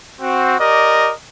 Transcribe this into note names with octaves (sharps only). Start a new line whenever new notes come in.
C4 F#4
G4 A#4 D5 D#5